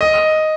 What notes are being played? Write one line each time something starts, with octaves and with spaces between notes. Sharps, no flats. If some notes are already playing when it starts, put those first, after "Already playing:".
D#5